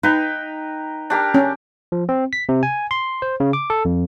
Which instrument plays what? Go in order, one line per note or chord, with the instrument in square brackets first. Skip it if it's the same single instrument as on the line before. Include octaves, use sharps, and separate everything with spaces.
[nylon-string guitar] D#4 [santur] B4 G5 A#5
[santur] D4 G4 A#4
[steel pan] C#4
[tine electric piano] F3
C4
B6
C3
G#5
C6
C5
C#3
D6
A4
F2